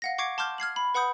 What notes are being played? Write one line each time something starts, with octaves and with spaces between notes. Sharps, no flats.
F5 F#5 A#6
F#5 C#6 D6 G#6 C7 D7
A5 C6 D6 F6 G6
F6 G#6 C7 F#7
B5
B4 F#5 B5 D#6 G6